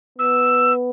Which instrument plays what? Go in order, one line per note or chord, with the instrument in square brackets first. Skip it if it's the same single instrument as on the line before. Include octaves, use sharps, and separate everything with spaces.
[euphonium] B3 [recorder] E6